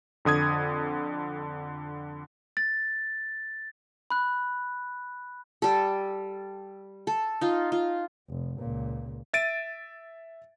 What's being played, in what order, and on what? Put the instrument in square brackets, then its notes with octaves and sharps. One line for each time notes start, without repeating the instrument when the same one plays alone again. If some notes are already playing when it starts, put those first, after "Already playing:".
[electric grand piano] F2 D3 D#6 G#6
[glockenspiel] A6
B5 F#6
[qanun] G3 A4
A4
D#4 F4
F4
[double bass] F1
C#2 A#2
[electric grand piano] E5 A6 D7 D#7